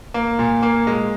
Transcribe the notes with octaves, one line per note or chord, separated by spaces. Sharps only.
A#3
A#2
A#3
G#3